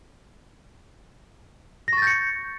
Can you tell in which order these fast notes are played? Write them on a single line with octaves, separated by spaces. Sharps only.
A#6 C#6 A6 G6 C#7